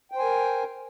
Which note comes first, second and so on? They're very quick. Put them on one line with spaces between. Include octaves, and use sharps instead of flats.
G5 C5 G#5 A#4